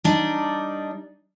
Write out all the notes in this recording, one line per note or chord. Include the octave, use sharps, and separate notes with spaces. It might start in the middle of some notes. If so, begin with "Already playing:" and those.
G3 D4 D#4